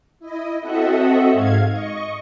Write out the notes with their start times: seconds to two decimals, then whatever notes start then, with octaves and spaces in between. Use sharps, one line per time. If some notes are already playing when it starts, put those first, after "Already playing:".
0.19 E4 D#5
0.60 C4 F#4 A4 D#5 E5 F#5
1.32 G#2 F5 G#6
1.69 D#5 C#6